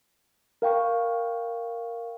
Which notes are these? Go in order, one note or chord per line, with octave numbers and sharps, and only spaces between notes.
A#4 F5 G5 C#6